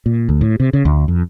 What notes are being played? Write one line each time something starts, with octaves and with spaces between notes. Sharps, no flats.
A#2
D2
A2
C3
C#3
D2
F2